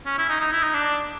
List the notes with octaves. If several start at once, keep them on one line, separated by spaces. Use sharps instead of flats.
C#4
E4
D#4
D#4
E4
D#4
D4